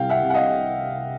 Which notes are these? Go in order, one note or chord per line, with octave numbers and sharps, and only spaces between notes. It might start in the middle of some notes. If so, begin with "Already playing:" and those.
Already playing: C2 F5 G5
E5 F#5
C3
F#5
D#5 F5